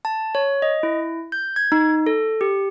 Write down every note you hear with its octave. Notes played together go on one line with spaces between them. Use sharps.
A5
C#5
D#5
E4
G6
G#6
D#4
A4
G4